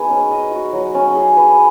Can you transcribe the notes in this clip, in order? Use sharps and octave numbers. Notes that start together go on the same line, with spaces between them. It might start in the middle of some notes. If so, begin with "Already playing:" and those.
Already playing: B3 D#4 F#4 G#4 B4
C#4
D#5
F#4
F#3
C#4
G#4
B4